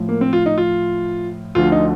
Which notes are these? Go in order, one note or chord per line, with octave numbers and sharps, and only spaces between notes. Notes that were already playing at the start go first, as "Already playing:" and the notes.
Already playing: A2 F3
A#3
C4
F4
D#4
F4
D2 D3 F3 F4
D#4